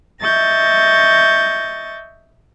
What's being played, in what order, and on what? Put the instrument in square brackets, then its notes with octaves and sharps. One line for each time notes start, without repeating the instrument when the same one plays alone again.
[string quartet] D#5 E5 C#6 G6 A6 A#6